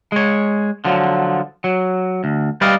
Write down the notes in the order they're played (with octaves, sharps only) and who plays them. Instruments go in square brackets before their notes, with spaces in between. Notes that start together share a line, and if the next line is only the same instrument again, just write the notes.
[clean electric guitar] G#3 C#5
D3 F3 F#3
F#3
D2
G3 B4 D5 D#5 F5